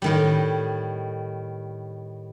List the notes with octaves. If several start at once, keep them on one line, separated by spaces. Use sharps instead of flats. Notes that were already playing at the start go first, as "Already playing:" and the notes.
A2 D#3 G3